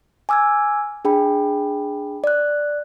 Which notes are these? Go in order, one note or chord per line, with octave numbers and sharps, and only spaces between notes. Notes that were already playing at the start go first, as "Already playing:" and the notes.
G#5 D6 E6 F6 G#6
D4 G#4 G5 B5
D5 F#6